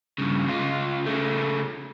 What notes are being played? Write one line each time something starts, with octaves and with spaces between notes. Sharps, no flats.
G2 C#3
C#2 F4
C#3 A3